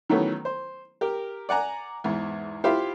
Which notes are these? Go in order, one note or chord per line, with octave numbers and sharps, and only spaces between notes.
D#3 E3 F#3 A3 B3 C#4
C5
G4 A#4
D5 F#5 G#5 A#5
E2 G#2
E4 F4 G4 C5 E5 F5